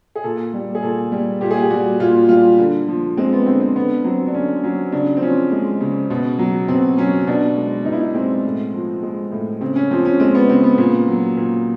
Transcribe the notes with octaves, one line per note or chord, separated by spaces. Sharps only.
G#4
A#2 A4
G3
G#4
A#2 A4
G3
A#2 G4
G#4
G4
G3 F#4
A#2 F4
G3 F4
D3
F3
G#3 C4
B3
D3 C4
C4
D3 B3
F#3 C4
D4
D3 C#4
F#3 C#4
C#3 D4
C4
F3 C#4
G#3
C#3
B2
F#3
B2 C4
F#3 C#4
B2 D4
G#3
B2 D#4
E4
D#4
G#3 C4
A2
F3
G#3
A2
C#3 C4
C#4
F3 C4
C#4
G#3 C4
B3
C#3 C4
B3
A#2
F#3
A#2